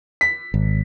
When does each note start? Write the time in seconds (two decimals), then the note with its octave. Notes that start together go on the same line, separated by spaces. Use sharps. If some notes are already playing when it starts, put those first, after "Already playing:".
0.21 B6
0.54 G#1